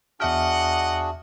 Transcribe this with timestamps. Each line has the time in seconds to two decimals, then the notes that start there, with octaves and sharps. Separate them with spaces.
0.20 E2 D4 F#4 G#4 D#5 E5 F#5 F6